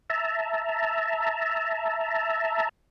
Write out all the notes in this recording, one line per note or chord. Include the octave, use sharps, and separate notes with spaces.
E5 A5 A#5